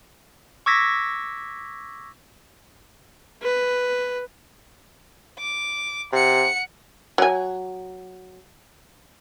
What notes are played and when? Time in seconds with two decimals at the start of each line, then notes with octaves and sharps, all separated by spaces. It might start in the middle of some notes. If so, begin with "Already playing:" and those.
0.66 C#6 D6 E6 G#6 A#6 B6
3.43 B4
5.39 D6
6.13 C3 F#5 C#7
7.18 F#3 G#5